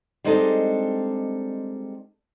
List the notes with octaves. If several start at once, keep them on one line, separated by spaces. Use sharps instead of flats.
G3 G#3 C4 D4 D#4 A4